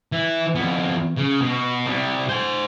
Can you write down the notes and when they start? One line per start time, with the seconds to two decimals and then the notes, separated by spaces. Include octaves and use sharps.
0.12 E3
0.55 F2 B3
1.17 C#3
1.42 B2
1.87 C2 G3
2.29 C5 G#5